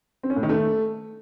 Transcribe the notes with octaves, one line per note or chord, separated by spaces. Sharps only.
C4
C#4
A2
D#3
A3